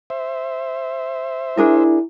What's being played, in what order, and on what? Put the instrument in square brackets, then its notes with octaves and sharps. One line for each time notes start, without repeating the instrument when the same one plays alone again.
[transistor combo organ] C5 E5
[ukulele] D4 G#4 A#4 [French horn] E4